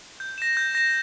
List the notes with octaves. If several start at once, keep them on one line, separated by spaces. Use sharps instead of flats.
G6
A#6 E7
G6
A#6 E7